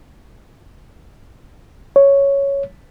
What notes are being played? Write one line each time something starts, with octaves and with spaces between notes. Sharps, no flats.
C#5